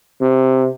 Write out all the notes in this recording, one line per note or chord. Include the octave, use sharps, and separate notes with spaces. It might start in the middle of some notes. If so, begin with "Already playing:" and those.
C3